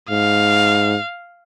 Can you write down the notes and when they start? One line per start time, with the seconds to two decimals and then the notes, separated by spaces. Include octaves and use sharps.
0.10 G#2 F5